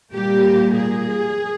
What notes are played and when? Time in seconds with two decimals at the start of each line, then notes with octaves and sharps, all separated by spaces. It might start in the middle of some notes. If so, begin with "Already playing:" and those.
0.12 A#2 G3 A#3 G4
0.74 G#4